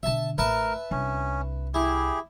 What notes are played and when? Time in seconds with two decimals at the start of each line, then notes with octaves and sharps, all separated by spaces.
0.03 B2 D3 E5 A5
0.38 A1 A2 A#4 B4 E5 A5
0.91 C2 C#4 D4
1.74 E4 G4 G#4